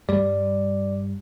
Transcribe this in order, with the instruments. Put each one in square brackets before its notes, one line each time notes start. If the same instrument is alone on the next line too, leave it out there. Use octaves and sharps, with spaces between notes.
[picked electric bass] G2 G3 [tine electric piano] D5